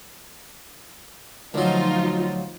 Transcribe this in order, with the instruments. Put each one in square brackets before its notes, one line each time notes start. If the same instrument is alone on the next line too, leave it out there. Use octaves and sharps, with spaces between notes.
[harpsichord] D2 F#3 [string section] F3 D#4 F4